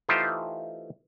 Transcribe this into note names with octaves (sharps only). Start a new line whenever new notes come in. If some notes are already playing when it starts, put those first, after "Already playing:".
E3 A3 D#4 F4 G4 C5